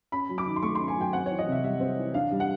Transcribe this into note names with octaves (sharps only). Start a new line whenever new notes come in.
C#4 B5
F#3
D6
D#3
C6
A3 C#6
C#4 C6
G#5
F#3 G5
C4 F#5
E3 C#5
D#5
C3 E5
G3 E5
C4
E3
D4 F5
G3
F#5